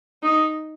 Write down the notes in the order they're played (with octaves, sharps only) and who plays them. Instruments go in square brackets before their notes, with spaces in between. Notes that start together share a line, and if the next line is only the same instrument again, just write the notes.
[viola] D#4